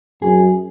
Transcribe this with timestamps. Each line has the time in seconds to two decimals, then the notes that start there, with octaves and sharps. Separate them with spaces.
0.22 F#2 G#4